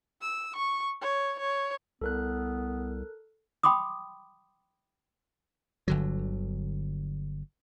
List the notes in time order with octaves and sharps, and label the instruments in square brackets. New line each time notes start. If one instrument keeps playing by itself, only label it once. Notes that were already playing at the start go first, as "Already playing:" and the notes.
[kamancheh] E6
C#6
C#5
C#5
[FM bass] C2 [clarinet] B3 [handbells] A4 A#4 F#6
[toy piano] G5 B5 C6 D6 D#6
[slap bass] G1 D3 F#3